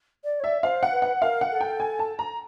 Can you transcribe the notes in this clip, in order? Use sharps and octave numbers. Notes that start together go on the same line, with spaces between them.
D5
C#5
D5 E5
C5 F5
F#5
B4
F#5
A#4 F5
F#5
A4
G5
G#5
A5
A#5